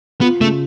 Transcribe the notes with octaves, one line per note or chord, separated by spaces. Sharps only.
B3 F4
C#3 A3